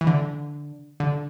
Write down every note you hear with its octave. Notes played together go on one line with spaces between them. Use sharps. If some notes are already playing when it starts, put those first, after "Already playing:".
E3
D3
D3